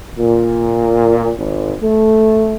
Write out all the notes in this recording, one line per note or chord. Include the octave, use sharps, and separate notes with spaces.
A#2
G#1
A3